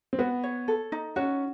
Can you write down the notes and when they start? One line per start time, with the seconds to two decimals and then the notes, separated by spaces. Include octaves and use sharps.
0.13 C4
0.19 B3 F#4
0.44 C#5
0.68 A4
0.92 D#4
1.16 C#4 F#4